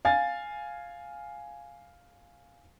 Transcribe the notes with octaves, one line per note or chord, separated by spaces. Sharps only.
F5 G#5 A6